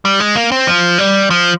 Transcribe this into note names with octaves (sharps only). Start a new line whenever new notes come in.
G3
G#3
A#3
C4
F3
G3
F3